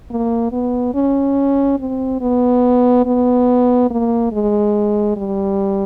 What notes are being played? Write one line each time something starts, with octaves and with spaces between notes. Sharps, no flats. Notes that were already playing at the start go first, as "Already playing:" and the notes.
A#3
B3
C#4
C4
B3
B3
A#3
G#3
G3